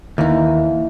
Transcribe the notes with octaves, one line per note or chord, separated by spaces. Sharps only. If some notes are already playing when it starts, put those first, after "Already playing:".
D#2 E3 D#4